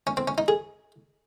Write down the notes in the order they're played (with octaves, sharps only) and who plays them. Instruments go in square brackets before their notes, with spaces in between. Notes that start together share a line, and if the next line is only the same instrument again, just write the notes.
[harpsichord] C#4
C4
C#4
D#4
G#4